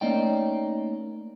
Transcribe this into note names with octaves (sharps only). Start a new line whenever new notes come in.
A3 A#3 C#4 D#4 D5 G5